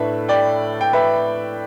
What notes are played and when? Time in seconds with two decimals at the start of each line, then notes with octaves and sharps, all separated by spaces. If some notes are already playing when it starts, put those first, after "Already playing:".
Already playing: A2 A3 D4 B4 E5
0.28 D5 G5
0.81 G5
0.93 B4 E5